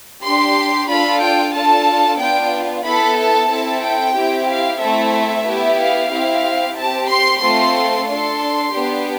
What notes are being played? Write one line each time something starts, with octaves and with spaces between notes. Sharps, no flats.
D4 G4 C6
D4 F4 A4 B5
G5
D4 F4 A4 A5
B3 D4 F4 G5
B3 E4 A4 B5
A5
C4 E4 A4
G5
C4 E4 G4
F5
A3 C4 E4 A4 E5
B3 E4 G4
F5
C4 E4 G4
C4 G4 A5
C6
A3 C4 F4 A4 C6
D4 A4 C6
B3 D4 G4